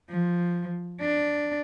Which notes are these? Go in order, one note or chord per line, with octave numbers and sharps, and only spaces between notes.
F3
D4